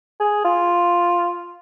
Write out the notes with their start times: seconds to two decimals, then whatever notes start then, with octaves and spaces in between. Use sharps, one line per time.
0.20 G#4
0.45 F4